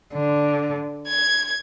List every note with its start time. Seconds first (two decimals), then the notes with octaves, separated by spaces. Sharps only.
0.14 D3
1.08 G#6